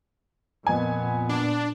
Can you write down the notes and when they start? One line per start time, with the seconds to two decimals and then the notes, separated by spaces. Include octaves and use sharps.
0.67 F2 A#2 B3 G#5
1.29 D4